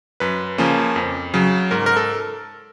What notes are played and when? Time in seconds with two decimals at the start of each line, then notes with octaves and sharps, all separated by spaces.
0.20 F#2 B4
0.58 C#3 F3 A#3 C#4
0.96 F2
1.34 C#3 F#3
1.71 G#2 A#4
1.86 A#4
1.97 A4